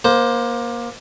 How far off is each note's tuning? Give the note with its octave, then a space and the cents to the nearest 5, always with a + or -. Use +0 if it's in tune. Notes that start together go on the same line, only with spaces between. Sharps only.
A#3 +25 C5 +0